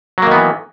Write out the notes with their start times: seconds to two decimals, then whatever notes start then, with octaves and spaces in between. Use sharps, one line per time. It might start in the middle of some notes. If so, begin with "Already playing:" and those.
0.18 F#3
0.22 A#3
0.27 D#3
0.31 B3
0.36 E3